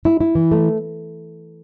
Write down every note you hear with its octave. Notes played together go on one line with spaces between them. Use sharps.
E4
E4
E3
A3